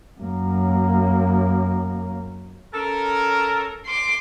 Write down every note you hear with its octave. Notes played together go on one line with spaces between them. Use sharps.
F#2 A#3
C#4 A4 A#4
C6 D6